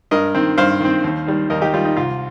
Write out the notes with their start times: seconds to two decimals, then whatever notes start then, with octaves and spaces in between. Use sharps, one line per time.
0.11 G2 A#4 D#5
0.35 D#3 C4
0.58 G2 C5 F5
0.80 D#3 C4
1.04 D#2
1.27 D#3 G3
1.50 D#2 A#4 D#5
1.61 D#4 G4
1.74 D#3 G3 F4
1.85 D#4
1.97 C2 F4